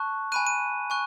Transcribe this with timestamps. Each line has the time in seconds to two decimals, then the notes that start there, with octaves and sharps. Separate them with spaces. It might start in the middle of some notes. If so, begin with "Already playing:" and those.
Already playing: A5 C#6 F#6
0.32 G#5 B5 F#6 D#7
0.47 D#7
0.90 G#5 C#6 F#6